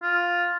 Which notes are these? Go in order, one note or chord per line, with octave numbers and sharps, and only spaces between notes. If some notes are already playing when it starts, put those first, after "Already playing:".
F4